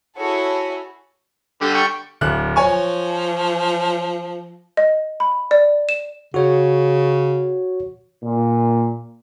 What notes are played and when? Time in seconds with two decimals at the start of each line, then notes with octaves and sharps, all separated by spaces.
0.18 E4 F#4 G#4 A4 C#5
1.62 D3 G3 G5
1.75 G5 C#6
2.21 D1 F#6
2.56 F3 C#5 G#5 C#6
4.77 D#5
5.20 B5
5.51 D5
5.89 E7
6.34 C#3 F#4 C#5
8.23 A#2